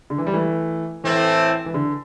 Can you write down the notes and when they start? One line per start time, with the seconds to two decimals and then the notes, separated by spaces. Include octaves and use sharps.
0.10 D3
0.18 E3
0.27 G3
0.34 E3 A3
1.04 A2 E3 A3 C4
1.66 E3
1.74 D3